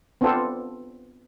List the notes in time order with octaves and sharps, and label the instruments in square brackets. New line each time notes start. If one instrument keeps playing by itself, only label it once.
[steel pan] B3 C4 D4 F4 A4